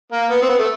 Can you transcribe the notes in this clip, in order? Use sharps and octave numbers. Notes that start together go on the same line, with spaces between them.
A#3
B3
C4
B3
A3